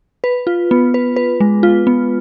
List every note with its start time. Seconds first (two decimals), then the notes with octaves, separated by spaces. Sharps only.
0.24 B4
0.47 F4
0.71 B3
0.94 B4
1.16 B4
1.40 G#3
1.63 F4
1.87 B3